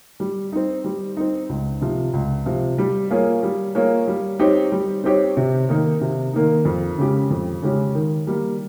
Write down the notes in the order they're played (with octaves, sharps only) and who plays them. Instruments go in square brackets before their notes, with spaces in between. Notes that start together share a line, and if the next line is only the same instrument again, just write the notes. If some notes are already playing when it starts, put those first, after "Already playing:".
[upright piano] G3
C4 D#4
G3
C4 D#4
C#2
C3 F3
C#2
C3 F3
G3
A#3 F4 G#4 C#5
G3
A#3 F4 G#4 C#5
G3
C4 D#4 G4 C#5
G3
C4 D#4 G4 C#5
C3
D#3 A#3 D#4
C3
D#3 A#3 D#4
F2
C#3 G#3 C#4 G4
F2
C#3 G#3 C#4 G4
D#3
G3 A#3